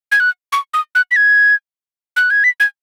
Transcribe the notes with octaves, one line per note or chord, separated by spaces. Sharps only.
G#6
F#6
C#6
D#6
F#6
B6
G#6
F#6
G#6
B6
G#6